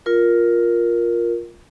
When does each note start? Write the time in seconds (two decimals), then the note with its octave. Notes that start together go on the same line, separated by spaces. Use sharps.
0.06 F4 A#4